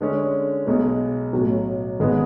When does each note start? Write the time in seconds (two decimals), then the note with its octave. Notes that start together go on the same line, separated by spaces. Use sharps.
0.01 D3 G#3 C#4
0.67 B1 B2 G#3
1.33 B1 A2 F#3
1.99 G#1 G#2 G#3 B3